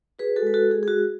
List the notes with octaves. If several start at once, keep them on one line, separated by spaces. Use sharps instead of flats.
F#4 G#4 B4
F#4 A4
G#3 B4
F#4 A4
G#3
G#4
G#4
F#4